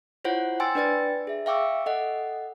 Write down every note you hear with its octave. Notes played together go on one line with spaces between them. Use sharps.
E4 F4 C5 C#5 F#5
G5 G#5 C6 E6 A6
D4 B4 D5 G5 A6
G#4 E5
E5 F5 G5 C#6 D6 E6
A4 D#5 F#5